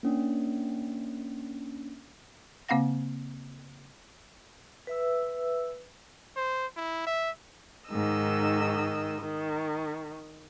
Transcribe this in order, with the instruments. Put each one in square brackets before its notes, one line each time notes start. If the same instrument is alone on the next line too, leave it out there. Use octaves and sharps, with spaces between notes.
[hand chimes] A#3 C#4 D4
[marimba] C#3 A#3 C4 F5 F#5 A#6
[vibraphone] B4 E5 E6
[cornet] C5
E4
E5
[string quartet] G#2 D#3 D#5 E6
D#3